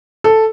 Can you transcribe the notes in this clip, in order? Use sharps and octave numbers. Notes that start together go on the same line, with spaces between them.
A4